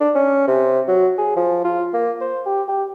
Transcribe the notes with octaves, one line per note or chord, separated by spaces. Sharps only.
D4
C#4
C3
F#3
G#4
F3
F4
A#3
C5
G4
G4